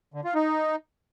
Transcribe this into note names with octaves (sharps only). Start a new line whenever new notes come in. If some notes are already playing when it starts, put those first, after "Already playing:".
D3
F4
D#4